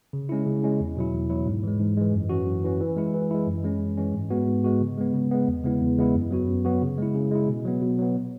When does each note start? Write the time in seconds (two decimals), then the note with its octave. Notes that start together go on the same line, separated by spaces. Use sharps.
0.13 C#3
0.29 G#3 C#4 E4
0.46 C#3
0.63 G#3 C#4 E4
0.80 E2
0.97 B2 F#3 E4
1.13 E2
1.30 B2 F#3 E4
1.47 G#2
1.63 E3 G#3
1.80 G#2
1.97 E3 G#3
2.14 F#2
2.29 E3 C#4 F#4
2.47 F#2
2.64 E3 C#4 F#4
2.80 E3
2.96 G#3 E4
3.14 E3
3.31 G#3 E4
3.47 F#2
3.63 E3 G#3 C#4
3.81 F#2
3.98 E3 G#3 C#4
4.14 G#2
4.31 G#3 B3 F#4
4.48 G#2
4.64 G#3 B3 F#4
4.81 C#3
4.98 G#3 B3
5.14 C#3
5.31 G#3 B3
5.47 E2
5.64 C#3 G#3 B3 E4
5.81 E2
5.98 C#3 G#3 B3 E4
6.14 F#2
6.31 F#3 B3 F#4
6.48 F#2
6.65 F#3 B3 F#4
6.82 C#3
6.98 G#3 E4
7.15 C#3
7.31 G#3 E4
7.48 B2
7.65 F#3 B3
7.81 B2
7.98 F#3 B3